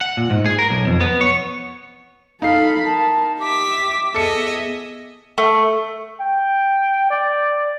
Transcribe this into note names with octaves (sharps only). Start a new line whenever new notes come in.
F#5
A#2
G#2
G#4
A#4
B1
F2
B3
C#5
D#4 A4 F5 B5 C7
A#4 A5
G4 E5 D6 B6
B3 G#4 A4 D#5 E5 C#7
A3
G5
D5